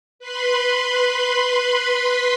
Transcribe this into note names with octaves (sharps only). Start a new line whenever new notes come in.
B4 B5 C6